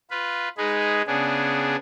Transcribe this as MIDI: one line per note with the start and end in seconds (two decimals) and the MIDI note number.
0.11 0.49 65
0.11 0.49 71
0.57 1.02 56
0.57 1.02 63
0.57 1.02 68
0.57 1.02 71
1.07 1.76 49
1.07 1.76 59
1.07 1.76 62
1.07 1.76 68